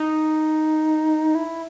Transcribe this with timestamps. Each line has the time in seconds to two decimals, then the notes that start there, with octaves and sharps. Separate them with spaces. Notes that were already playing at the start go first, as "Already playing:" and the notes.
Already playing: D#4
1.35 E4